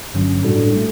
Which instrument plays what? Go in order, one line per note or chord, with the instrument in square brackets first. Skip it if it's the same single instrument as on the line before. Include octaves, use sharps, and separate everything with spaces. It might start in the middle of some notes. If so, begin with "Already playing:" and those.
[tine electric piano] G1 G2 D3 F#3 C#4
A2 G3 D4 F#4 A4
A3